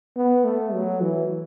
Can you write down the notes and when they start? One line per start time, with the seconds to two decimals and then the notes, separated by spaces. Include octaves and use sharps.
0.17 B3
0.45 A3
0.73 F#3
1.01 E3